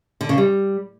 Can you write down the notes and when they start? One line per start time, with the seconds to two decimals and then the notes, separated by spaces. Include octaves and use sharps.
0.21 D3
0.29 C#3
0.38 G3